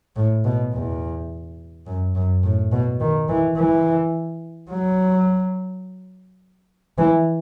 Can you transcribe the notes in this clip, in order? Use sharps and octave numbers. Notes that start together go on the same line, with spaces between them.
A2
B2
E2
F#2
F#2
A2
B2
D#3
E3
E3
F#3
E3